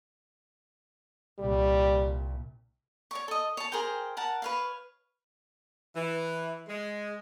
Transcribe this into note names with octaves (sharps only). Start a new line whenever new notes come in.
C2 A#2 G3
C#5 D5 C#6
A4 D#5
C#5 A5
G#4 A#4 C5 G5
A#4 F#5 A5
B4 C#5 F5
E3
G#3